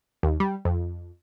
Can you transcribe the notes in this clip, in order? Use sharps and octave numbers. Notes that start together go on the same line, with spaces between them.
D#2
G3
F2